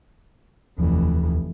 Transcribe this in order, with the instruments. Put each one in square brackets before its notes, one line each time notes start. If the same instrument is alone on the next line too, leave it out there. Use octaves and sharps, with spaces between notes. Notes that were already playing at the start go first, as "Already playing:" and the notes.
[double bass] F1 E3 [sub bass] D#2